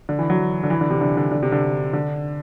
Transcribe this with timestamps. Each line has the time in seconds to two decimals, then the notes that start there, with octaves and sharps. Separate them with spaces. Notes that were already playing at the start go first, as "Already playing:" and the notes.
0.09 D3
0.19 E3
0.30 F#3
0.63 D3
0.70 E3
0.81 D3
0.91 C3
1.01 D3
1.17 D3
1.32 D3
1.43 C3
1.52 D3
1.93 D3